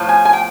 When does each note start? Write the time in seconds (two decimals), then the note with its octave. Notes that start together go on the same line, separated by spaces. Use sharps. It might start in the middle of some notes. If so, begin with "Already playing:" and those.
Already playing: A2 F3
0.09 G#5
0.25 G#5
0.33 G5